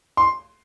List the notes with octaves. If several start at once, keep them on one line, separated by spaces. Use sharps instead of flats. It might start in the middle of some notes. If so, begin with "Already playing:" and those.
C6